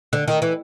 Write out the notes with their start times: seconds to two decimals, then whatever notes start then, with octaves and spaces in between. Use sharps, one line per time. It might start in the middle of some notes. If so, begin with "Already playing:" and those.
0.13 D3
0.28 D#3
0.42 E3